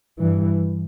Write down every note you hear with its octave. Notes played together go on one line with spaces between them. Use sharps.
G2 E3